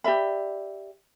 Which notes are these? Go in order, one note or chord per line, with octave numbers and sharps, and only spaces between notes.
G4 D5 E5 B5